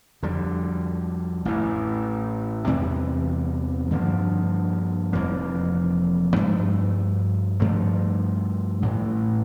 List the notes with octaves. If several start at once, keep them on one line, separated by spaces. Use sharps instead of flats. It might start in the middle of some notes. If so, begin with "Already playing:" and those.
F2 D3 G3
A1 A2 E3
E2 C3 E3 G3
G2 D3 F3 A#3
F1 F2 E3 A#3
G2 F3 A3
G2 F3 A3
A1 A2 E3